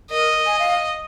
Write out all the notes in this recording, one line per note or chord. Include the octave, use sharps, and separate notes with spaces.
A#4 D#5
G#5
F5